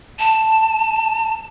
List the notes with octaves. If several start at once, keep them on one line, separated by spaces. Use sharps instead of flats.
A5